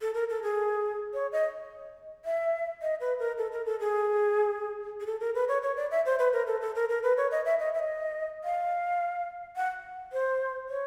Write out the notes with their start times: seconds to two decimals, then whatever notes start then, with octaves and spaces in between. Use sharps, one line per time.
0.01 A4
0.14 A#4
0.29 A4
0.43 G#4
1.14 C#5
1.32 D#5
2.25 E5
2.82 D#5
3.00 B4
3.19 A#4
3.38 A4
3.52 A#4
3.66 A4
3.80 G#4
5.00 G#4
5.06 A4
5.20 A#4
5.35 B4
5.48 C#5
5.63 C#5
5.76 D5
5.91 E5
6.06 C5
6.19 B4
6.33 A#4
6.47 A4
6.62 A4
6.75 A#4
6.89 A#4
7.03 B4
7.17 C#5
7.31 D#5
7.45 E5
7.59 D#5
7.74 E5
7.79 D#5
8.44 F5
9.56 F#5
10.13 C5
10.69 C#5